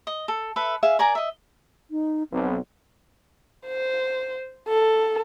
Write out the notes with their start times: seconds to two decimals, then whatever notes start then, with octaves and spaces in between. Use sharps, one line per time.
0.07 D#5
0.28 A4
0.56 A4 B4 E5
0.83 G#4 E5 F5
0.99 A#4 D5 G#5 A#5
1.15 D#5 E5
1.91 D#4
2.32 B1 C4
3.67 C5
4.68 A4